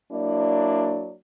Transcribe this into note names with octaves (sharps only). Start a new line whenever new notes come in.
F#3 A#3 D4 E4 D5